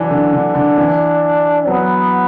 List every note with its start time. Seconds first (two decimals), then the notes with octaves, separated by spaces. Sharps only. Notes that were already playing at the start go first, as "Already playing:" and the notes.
Already playing: E3 F#3 D4
0.10 D3
0.33 D3
0.55 D3
0.78 E3
1.67 F#3 B3